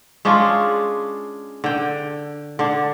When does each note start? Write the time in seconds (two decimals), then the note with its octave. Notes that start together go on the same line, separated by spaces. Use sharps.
0.25 G#3 C#4 D4 F4
1.64 D3 G5
2.59 D3 D4